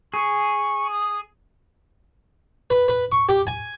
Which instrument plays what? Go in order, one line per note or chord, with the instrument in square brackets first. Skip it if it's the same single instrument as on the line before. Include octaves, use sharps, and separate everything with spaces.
[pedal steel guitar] G#4 [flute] C#6
[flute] D#6
[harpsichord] B4
B4
C#6
G4
G#5